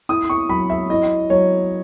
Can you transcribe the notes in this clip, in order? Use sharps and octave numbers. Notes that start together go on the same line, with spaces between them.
E4 D#6
C#6
F#3 B5
E5
E4 D#5
F#3 C#5